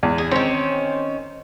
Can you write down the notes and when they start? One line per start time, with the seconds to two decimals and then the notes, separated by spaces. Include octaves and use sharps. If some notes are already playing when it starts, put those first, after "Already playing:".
0.03 E2
0.18 G#4
0.31 D#3 C4 C#4